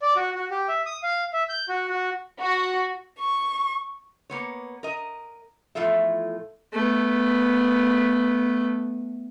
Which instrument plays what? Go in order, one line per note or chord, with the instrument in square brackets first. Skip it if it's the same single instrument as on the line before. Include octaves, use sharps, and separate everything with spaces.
[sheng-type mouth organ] D5
F#4
F#4
G4
E5
D#6
F5
E5
G6
F#4
F#4
[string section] F#4
[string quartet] C#6
[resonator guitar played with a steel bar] A#3 B3 C#5
A#4 D#5
E2 A2 F3 F4 A4 E5
[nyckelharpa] A3 B3